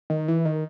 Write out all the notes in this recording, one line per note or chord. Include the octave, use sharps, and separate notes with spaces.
D#3
E3
D#3